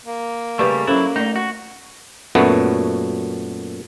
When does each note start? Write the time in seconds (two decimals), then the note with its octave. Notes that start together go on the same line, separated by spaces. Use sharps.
0.06 A#3
0.59 C#3 G3 A3 G4 B4 D5
0.87 F#3 C#4 E4 A4 C5
1.16 A3 D#4 D5
1.36 F#4
2.35 F#2 A#2 A3 B3 F#4